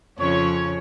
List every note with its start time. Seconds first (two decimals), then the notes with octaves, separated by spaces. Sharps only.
0.18 F2 C#3 C#4 C#5